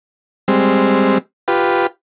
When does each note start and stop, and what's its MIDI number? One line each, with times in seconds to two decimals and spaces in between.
0.48 1.18 55
0.48 1.18 56
0.48 1.18 60
1.48 1.87 65
1.48 1.87 67
1.48 1.87 71